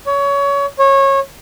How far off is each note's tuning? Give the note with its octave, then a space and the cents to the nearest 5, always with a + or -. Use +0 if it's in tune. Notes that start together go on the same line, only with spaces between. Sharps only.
C#5 +25
C#5 -20